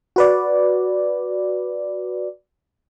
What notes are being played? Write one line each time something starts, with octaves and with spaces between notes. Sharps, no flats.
F#4 B4 D5